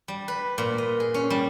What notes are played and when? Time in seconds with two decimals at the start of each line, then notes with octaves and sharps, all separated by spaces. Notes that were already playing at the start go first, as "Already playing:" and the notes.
0.08 G3
0.28 B4
0.58 A#2
0.78 D#5
1.00 G#4
1.14 C#4
1.30 G3